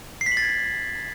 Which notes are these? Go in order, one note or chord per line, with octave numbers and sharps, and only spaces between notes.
C7
B6
F#7
A6
G#6